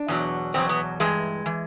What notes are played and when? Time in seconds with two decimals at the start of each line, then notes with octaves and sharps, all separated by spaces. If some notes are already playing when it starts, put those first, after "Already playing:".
Already playing: D4
0.08 E2 B2 F#3
0.54 E2 B2 F#3 C4
0.69 B3
1.00 G2 E3 G#3
1.46 E3